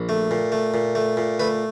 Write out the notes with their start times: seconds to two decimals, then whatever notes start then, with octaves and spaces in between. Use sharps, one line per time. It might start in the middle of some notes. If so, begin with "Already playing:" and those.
Already playing: A#1
0.09 A3
0.31 A#2
0.52 A3
0.74 A#2
0.95 A3
1.17 A#2
1.40 A3 B4